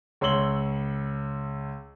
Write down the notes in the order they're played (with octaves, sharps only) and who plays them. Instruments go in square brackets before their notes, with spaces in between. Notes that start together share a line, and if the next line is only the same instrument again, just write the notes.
[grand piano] C#2 C#5 C6 E6 F#7 G7